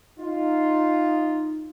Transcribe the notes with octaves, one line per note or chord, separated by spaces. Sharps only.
D#4 F4